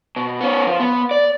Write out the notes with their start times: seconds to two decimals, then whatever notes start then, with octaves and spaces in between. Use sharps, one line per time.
0.16 B2
0.41 B3 C#4
0.67 F3
0.80 B3
1.11 D5